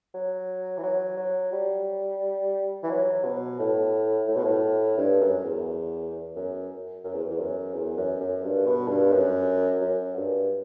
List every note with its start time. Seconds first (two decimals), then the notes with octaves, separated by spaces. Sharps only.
0.14 F#3
0.78 E3
0.83 F#3
1.17 F#3
1.52 G3
2.83 E3
2.90 F#3
3.25 B2
3.59 A2
4.28 A2
4.37 B2
4.45 A2
4.97 G2
5.21 F#2
5.44 E2
6.36 F#2
7.04 F#2
7.14 E2
7.31 E2
7.40 F#2
7.74 E2
7.97 F#2
8.20 F#2
8.43 G2
8.66 B2
8.88 G2
9.12 F#2
9.81 F#2
10.16 G2